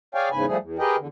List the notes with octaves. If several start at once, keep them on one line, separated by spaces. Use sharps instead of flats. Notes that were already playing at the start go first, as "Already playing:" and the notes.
G#4 C#5 D5 F5 G5 G#5
E2 G#2 C#3 B4 G#5
F3 G3 A3 G#4
E2
G4 G#4 A#4 B4 D#5 G5
E2 D3